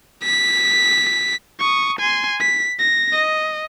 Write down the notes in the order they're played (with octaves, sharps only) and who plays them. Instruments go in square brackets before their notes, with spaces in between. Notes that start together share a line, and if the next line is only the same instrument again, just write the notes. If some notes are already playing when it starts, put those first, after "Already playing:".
[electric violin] B6
C#6 D#6
G#5 C6
B6
A#6
D#5